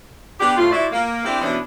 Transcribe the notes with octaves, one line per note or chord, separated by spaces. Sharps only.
B3 D4 G4
A2 F4
E4 F#4 C5 D5 E5
A#3
C4 D4 E4 G4
B2 E3 B3 C#4 D4